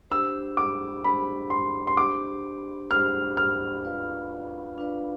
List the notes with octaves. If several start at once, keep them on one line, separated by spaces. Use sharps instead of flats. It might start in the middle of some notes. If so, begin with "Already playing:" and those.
D4 G4 C5 E6
D6
D4 G4 C5 B5
C6
C6
D4 G4 C5 D6
D4 G4 C5 F6
F6
D4 F4 B4 D5 F5
D4 F4 B4 D5 F5